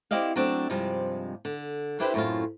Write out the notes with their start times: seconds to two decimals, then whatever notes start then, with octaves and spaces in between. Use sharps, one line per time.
0.11 C4 E4 G4 D5 D#5 F5
0.36 F#3 A3 C4 D4
0.70 G2 C3 F3 G3 G#3
1.45 D3
2.00 D4 E4 G4 B4 C5
2.14 F#2 A2 C4 F4